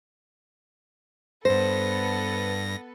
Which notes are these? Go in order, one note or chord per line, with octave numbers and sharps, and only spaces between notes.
G2 B3 A4 B4 C5 A#6